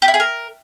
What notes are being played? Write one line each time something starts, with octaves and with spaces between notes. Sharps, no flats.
G4
E4
G#4
A#4